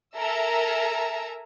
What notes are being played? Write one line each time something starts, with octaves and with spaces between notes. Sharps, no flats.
A4 A#4 E5 G#5 A#5 E6